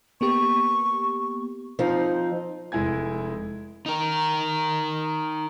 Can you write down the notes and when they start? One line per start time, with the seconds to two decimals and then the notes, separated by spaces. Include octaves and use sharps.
0.21 A#3 B3 G4 C#6
1.79 F3 C4 D#4
2.72 F1 G#3 E4 G#5 G#6
3.86 D#4 A#4